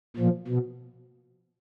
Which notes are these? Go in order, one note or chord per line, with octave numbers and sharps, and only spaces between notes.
A#2 F3
B2